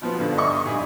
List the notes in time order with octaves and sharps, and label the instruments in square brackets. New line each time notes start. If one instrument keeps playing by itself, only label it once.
[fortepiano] B2 F3 B3
G2 D3
D#5 E5 C#6
D#6
G2 G#5